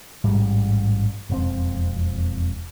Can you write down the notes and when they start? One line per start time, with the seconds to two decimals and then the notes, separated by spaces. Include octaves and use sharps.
0.24 A1 G#2 G3
1.30 E1 F2 C4